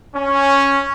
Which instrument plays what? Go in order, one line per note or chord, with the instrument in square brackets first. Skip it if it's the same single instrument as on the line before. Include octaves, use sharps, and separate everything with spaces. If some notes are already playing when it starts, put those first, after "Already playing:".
[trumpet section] C#4